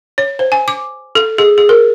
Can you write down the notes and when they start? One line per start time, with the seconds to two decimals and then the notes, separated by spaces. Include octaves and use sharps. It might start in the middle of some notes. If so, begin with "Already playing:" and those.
0.18 C#5
0.39 C5
0.52 G#5
0.68 D6
1.15 A4
1.38 G#4
1.58 G#4
1.69 A#4